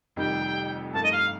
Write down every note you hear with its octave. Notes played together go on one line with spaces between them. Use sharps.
F1 F2 D#3 G3 G5
G2 F3 A3 D#4 A5
D#5
F5